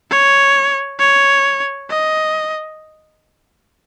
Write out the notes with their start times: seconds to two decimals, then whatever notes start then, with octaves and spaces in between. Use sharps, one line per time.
0.11 C#5
0.99 C#5
1.90 D#5